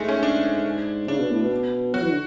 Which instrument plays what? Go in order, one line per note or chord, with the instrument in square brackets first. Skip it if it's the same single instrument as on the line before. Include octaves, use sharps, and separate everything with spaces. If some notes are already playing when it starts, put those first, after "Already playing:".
Already playing: [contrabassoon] G#2 [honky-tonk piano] G#3 A3
[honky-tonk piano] C#4
D4
[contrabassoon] C#3 [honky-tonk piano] D4
[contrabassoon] B2
A2
B2
[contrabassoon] F#3 [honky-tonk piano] F#4
[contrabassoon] E3
D3